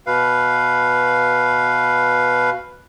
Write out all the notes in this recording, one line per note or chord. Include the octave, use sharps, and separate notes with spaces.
B2 B4 F5